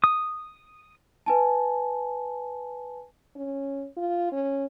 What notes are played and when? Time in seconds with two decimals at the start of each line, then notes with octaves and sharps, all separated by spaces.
0.04 D#6
1.26 B4 G#5 A5
3.35 C#4
3.97 F4
4.32 C#4